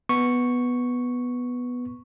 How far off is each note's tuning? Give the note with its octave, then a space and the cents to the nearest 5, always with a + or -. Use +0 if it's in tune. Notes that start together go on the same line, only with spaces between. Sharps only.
B3 +0 C#6 +0